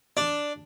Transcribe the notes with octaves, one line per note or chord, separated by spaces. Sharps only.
D4